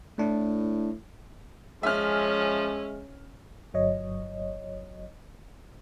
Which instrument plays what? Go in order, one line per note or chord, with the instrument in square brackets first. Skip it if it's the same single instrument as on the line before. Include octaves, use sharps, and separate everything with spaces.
[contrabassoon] A2 [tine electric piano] A3 D4 E4
[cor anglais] F3 [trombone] G#3 [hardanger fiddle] C#4 [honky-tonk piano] E5 F6
[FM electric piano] G1 F#3 C#5 D#5